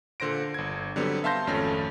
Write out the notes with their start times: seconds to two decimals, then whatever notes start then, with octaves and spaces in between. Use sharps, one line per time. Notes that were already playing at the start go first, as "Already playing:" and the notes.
0.20 A#2 D3 C5 A#6 D7
0.54 G1 G#6
0.96 D3 F#3 G3 B3 C4
1.24 E5 F5 A5 C6 G6 A#6
1.47 G#1 F2 A3 C#4